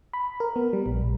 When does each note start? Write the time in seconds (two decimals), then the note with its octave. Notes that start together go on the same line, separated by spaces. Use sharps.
0.13 B5
0.40 A#4
0.56 B3
0.73 G3
0.86 A#1
1.02 A#1